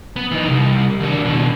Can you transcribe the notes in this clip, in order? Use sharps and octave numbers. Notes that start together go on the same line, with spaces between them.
B3
E3 D#4
C2
D#2 D4
D#2 B2